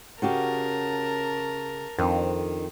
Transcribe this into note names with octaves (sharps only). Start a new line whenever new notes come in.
C#3 F#4 G4 A#4 A5
F2 D#3 C4 D4